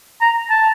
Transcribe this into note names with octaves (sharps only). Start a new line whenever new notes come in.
A#5
A5